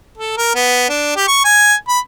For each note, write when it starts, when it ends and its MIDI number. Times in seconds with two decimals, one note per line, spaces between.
0.18 0.35 69
0.37 0.52 70
0.55 0.88 59
0.89 1.14 62
1.16 1.27 67
1.28 1.43 85
1.45 1.74 80
1.88 1.99 83